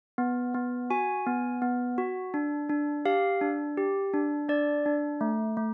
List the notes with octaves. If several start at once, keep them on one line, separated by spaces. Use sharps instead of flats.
B3
B3
F#4 G#5
B3
B3
F#4
D4
D4
G4 F5
D4
G4
D4
D4 D5
D4
A3
A3